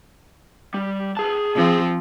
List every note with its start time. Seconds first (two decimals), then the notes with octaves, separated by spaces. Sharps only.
0.74 G3
1.17 G#4 A5
1.55 F3 C4